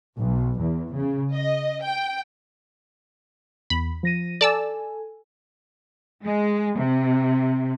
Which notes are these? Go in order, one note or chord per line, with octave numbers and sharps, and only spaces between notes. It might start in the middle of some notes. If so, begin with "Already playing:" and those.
B1
E2
C#3
D#5
G5
E2 B5
F3 A#6 D#7
A4 D5 G#5 A5 E6
G#3
C3